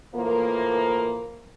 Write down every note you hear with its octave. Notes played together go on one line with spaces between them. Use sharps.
A2 E3 F3 A#3